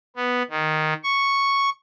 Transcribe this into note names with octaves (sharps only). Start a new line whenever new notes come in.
B3
D#3
C#6